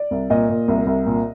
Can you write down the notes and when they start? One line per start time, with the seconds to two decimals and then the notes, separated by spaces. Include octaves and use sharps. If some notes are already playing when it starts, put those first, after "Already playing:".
Already playing: D5
0.11 C2
0.30 A#2 D#5
0.49 A#2
0.68 C2
0.86 C2
1.06 A#2